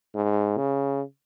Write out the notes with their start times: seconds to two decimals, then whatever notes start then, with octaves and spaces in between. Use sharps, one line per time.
0.15 G#2
0.57 C#3